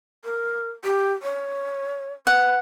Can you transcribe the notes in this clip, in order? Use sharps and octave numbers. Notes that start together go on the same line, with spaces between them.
A#4
G4
C#5
B4 F#5